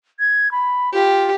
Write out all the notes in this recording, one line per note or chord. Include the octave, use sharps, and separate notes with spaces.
G#6
B5
F4 G4